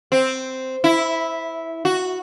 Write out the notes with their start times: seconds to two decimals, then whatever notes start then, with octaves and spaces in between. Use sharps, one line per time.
0.12 C4
0.84 E4
1.85 F#4